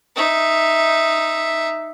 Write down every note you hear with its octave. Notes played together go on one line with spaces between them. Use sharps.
D#4 E5